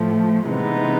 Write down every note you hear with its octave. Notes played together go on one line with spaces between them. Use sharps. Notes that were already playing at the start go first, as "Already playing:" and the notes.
Already playing: A2 F3 A3
C3 E3 G#3 B3 D#4